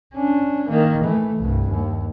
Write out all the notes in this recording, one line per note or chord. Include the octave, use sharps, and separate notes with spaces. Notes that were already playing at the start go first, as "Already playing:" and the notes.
C#4 D4
D#3 A#3
E3 A3
C2 G2
D#2